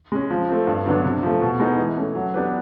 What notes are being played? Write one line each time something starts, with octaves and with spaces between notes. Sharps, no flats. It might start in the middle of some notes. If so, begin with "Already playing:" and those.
G#3 C#4
F3
A3 C4
G2
D3 F#3 B3 D4
C3
F3 A3
B2
G#3 B3 D#4
E3
A3 C#4
F#3
B3 D4 G4 B4